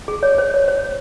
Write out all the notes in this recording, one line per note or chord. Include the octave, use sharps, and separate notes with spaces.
G#4
C#5
C5
C#5
C5